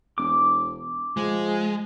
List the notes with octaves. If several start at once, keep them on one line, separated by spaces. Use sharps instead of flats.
E1 D6
F3 G#3